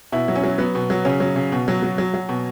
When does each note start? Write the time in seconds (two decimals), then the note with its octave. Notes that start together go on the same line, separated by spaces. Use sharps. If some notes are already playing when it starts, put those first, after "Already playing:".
0.12 B2 E4
0.28 F#3
0.36 C#4
0.44 F#3
0.58 F#3 B3
0.75 B2
0.90 F#3
1.05 C#3 C#4
1.20 F#3
1.36 C#3
1.52 B2
1.68 F#3
1.83 F#3
1.98 F#3
2.14 F#3
2.29 B2